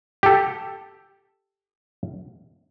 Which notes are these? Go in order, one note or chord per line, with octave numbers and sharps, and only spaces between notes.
G4 A4